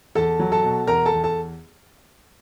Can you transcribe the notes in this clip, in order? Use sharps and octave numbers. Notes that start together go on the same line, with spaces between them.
E2 A4 A5
F#3
A4 A5
B2
E2 A#4 A#5
A4 A5
E2
A4 A5